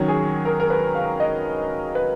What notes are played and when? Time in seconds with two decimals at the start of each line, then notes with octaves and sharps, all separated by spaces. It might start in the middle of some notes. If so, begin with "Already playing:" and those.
Already playing: D#3 F#3 C#4 F#4
0.08 G#4
0.45 A#4
0.60 A#4
0.70 B4
0.95 F5
1.20 D#5
1.95 B4